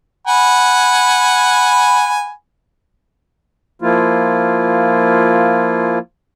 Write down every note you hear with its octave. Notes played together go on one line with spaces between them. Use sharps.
F#5 G#5 B5
F3 A#3 E4 F4